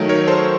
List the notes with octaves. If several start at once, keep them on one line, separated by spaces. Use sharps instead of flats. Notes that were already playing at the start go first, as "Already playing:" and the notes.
Already playing: D#3 F#3 A3
A#4 C#5
A4 C5